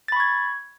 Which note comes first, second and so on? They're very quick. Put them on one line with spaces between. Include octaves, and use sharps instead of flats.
A6 B5 C#6 G#6